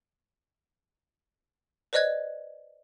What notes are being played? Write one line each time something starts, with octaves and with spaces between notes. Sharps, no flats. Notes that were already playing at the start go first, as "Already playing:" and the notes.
B4 C5 D5 D#5 F#6 G#6